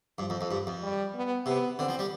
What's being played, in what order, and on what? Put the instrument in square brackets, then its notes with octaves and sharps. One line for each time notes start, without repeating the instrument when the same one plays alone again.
[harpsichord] G2 [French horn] F3
[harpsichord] F2
F2
G2
F2
[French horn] G3
B3
[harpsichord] C3 [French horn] B3
[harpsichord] D3 [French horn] C4
[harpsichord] F3
G3